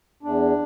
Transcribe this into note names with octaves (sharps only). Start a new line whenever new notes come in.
E2 D4